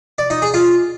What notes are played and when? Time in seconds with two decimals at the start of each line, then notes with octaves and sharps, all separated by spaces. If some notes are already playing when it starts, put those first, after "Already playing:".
0.18 D5
0.30 D#4
0.42 G#4
0.54 F4